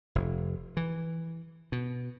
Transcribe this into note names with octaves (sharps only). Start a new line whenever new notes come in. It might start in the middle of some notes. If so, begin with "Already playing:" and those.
F1
E3
B2